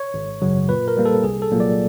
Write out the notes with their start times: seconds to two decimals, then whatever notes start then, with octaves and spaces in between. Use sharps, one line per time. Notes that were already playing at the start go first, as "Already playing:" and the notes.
Already playing: C#5
0.14 G#1
0.42 F#2 C#3 F#3
0.69 A#2 B4
0.88 A#4
0.97 G3 A#3
1.05 A4
1.24 C2 G#4
1.42 A4
1.51 A#2 F#3 A#3
1.60 D5